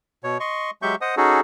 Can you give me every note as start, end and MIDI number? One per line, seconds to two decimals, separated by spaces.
0.24 0.38 47
0.24 0.38 73
0.40 0.71 75
0.40 0.71 84
0.40 0.71 85
0.82 0.95 54
0.82 0.95 56
0.82 0.95 67
0.82 0.95 76
0.82 0.95 85
0.82 0.95 91
1.01 1.15 72
1.01 1.15 75
1.01 1.15 78
1.01 1.15 87
1.17 1.41 61
1.17 1.41 63
1.17 1.41 66
1.17 1.41 68
1.17 1.41 69